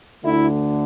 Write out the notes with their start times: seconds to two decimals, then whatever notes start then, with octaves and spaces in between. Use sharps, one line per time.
0.25 D2 D3 A3 E4